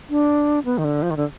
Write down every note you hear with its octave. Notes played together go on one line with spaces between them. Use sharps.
D4
B3
D#3
D3
F3
D#3
D3